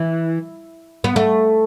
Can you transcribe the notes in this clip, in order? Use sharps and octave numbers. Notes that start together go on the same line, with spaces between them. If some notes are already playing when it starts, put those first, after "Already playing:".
Already playing: E3
B3
A3